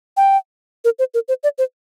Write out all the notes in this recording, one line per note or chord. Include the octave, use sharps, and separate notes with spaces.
G5
A#4
C5
A#4
C5
D5
C5